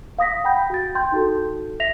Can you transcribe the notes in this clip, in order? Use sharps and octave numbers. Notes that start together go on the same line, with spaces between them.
F5 D#6 A#6 B6
F#5 G5 B5 G6
F#4 A6
G5 C6 G6
D#4 F#4 A4
E5 A#6 B6 F7